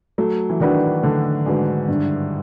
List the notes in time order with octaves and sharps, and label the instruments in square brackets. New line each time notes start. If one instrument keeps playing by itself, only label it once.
[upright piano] F#3 [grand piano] A3
[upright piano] E3
[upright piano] D#3 [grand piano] D4 F#4 B4
[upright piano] D3 [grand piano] A3
[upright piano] G#2 [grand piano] D4 F#4 B4
[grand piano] G2